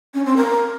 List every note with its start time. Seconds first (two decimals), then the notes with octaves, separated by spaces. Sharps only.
0.14 C#4
0.25 C4
0.37 A#4